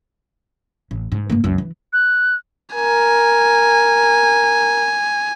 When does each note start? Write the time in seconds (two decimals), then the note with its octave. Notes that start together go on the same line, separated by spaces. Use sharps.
0.91 A1
1.12 G#2
1.30 G2 A#3
1.44 C#2 F#2
1.58 E3
1.93 F#6
2.75 A#4 G#5